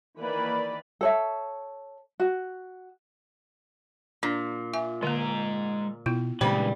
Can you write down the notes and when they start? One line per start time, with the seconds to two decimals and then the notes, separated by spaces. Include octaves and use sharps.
0.19 D#3 E3 A#3 B4 D5 B5
1.01 A4 C#5 E5
2.20 F#4
4.23 A#2 D4
4.73 F4 E5 G#5
5.03 D3 G#3 A#3 A#5
6.06 B2 B3 E4 F4
6.41 G2 A#2 C#3 E3 G3 G#3 C5